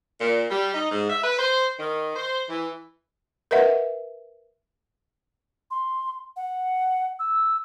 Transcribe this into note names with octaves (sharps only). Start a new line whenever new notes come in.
A#2
G3
D#4
G#2
E5
B4
C5
D#3
C5
E3
A#4 B4 D#5 E5 F#5
C6
F#5
E6